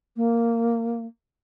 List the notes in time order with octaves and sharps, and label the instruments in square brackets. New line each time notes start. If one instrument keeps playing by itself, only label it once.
[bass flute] A#3